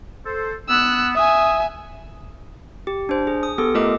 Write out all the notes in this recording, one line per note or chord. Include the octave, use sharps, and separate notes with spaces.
A4 C5
B3 E6 F#6
E5 G#5 D#6
G4
D4 C5
G#4
D#6
B3 G4 A4 D#6
A3 F4 A#4 D#5 D6